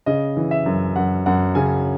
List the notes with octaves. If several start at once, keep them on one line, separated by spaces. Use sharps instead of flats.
C#3 D#5
E3
E5
F#2
F#2 F#5
F#2 F#5
C#3 G#5